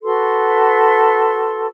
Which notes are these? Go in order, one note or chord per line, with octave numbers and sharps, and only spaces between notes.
F#4 A4 B4 C6